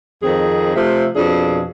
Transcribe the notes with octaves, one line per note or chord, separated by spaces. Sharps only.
F2 D#3 C4 G#4
C3 F3 A3 E5
F2 B2 D4 G#4